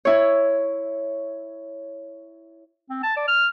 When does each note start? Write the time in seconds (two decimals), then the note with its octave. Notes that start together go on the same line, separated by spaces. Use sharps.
0.05 E4 C#5
2.90 C4
3.03 A5
3.17 D5
3.28 F6